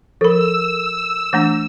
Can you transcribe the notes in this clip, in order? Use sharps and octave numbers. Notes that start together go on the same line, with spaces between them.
F3 A4 A#4 B5 E6
E3 A3 D4